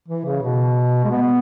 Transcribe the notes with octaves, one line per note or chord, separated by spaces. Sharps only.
E3
C#3
B2
G#3
B3